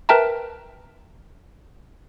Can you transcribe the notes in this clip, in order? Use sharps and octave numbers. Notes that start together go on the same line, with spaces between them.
A#4 B4 E5 G5 A5 A#5